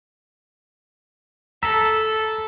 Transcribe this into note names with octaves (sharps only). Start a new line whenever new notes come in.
A4 A#5 E6 B6